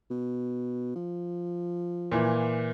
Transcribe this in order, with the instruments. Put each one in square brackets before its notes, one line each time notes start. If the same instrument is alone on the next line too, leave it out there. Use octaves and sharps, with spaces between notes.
[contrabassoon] B2
F3
[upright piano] A#2 E3